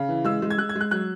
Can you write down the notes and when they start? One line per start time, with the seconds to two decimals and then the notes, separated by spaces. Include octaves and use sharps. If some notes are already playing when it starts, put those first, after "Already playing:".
Already playing: C#3
0.09 E3
0.25 G#3 E6
0.42 G#3
0.50 G#6
0.58 G#3 F#6
0.69 G#6
0.76 G#3
0.81 F#6
0.91 F#3 F#6